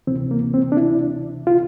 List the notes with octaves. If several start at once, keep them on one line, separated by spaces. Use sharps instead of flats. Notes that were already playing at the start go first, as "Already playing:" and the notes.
D2 C3 E3 C4
A#3
C4
D4
E4
F4